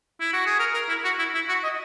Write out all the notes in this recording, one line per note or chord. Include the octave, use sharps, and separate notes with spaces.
E4
F#4
G#4
A#4
A#4
E4
F#4
E4
E4
F#4
D#5